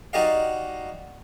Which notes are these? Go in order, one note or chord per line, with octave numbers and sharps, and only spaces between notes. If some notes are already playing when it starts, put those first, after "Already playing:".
D#4 F#4 G4 D5 D#5 F5